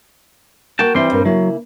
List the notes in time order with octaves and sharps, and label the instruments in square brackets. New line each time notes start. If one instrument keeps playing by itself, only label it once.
[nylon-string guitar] A#3 A#4 [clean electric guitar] F#4 G5 A5
[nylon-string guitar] E3 E4 [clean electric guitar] G3 C4 C6
[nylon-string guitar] G2 A#2 A#4
[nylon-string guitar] C#3 A#3 E4 [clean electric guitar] F#3